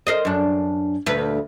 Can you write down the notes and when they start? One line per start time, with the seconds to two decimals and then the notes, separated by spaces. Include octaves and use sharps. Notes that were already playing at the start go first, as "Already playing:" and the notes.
0.07 A#4 C5 D#5
0.25 F#2 D4
1.06 D2 A#2 B4